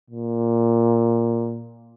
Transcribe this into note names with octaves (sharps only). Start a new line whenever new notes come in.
A#2